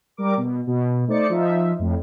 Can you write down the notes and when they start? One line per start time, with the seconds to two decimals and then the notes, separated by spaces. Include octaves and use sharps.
0.17 G3 A#4 D6
0.37 B2
0.67 B2
1.08 A3 D#4 C5 D5 A6 C#7
1.29 F3 D#4 F4 E5
1.79 F2 A2